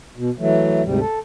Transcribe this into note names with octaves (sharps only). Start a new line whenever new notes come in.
B2
E3 F#3 A3
D2 G#2 C3 G3
A4